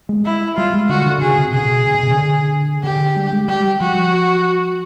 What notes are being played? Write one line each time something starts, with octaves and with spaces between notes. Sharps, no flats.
G#3
E4
G3 F4
G#3
D3 F#4
D3
C#3 G#4
C3
B2 G#4
C3
B2
C3
D3
D3 G4
G3
G#3
G3 G4
F3 F#4